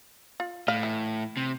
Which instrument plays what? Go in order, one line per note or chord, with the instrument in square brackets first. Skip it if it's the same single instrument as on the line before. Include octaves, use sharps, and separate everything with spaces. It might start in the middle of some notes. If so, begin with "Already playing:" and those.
[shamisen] F4
[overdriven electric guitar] A2 [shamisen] F5
[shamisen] E3
[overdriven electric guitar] C3